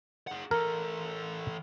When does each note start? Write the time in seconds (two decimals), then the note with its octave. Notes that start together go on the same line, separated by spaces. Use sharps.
0.27 G#4 F#5
0.51 E3 A4 A#4